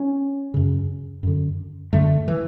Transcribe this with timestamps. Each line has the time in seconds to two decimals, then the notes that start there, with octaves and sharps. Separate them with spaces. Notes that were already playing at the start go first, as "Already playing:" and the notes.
Already playing: C#4
0.54 F#2 C#3
1.23 F#2 D3
1.92 F#2 D3 A3
2.28 E3